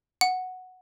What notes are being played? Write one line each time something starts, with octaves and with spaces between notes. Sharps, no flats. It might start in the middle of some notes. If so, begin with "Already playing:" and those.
F#5